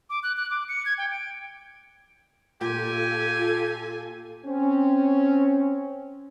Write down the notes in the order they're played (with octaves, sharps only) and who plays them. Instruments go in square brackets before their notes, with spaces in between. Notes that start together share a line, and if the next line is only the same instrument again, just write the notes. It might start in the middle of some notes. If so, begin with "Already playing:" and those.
[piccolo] D6
F#6
F#6
D6
C#7
G#6
G5
D7
[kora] A#2 [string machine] F4 A4 [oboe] G4 [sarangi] G#5
[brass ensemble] C4 C#4